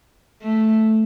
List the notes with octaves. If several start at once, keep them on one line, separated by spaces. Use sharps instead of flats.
A3